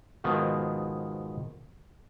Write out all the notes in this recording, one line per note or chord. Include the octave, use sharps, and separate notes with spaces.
G#2 B2 D#3 F3